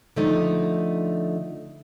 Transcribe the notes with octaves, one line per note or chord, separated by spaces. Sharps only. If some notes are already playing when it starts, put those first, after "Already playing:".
D3 F3 A3 D#4